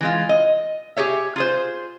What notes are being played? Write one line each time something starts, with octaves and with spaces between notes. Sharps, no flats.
E3 G#3 F4
D#5
G4 G#4 C#5 E5
F4 G#4 C5